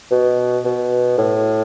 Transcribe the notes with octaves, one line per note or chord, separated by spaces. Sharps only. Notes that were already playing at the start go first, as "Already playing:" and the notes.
B2
B2
A2